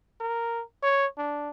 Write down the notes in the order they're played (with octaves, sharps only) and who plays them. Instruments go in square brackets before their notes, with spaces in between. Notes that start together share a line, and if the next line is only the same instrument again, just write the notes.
[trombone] A#4
C#5
D4